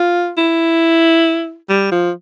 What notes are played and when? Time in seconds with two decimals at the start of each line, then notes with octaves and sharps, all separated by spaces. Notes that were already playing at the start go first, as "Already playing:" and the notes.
Already playing: F4
0.38 E4
1.69 G3
1.92 F3